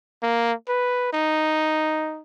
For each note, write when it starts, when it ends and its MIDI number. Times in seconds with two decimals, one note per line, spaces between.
0.23 0.53 58
0.69 1.11 71
1.13 2.21 63